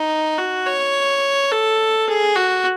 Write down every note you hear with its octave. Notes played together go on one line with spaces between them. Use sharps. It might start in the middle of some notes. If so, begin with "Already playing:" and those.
Already playing: D#4
F#4
C#5
A4
G#4
F#4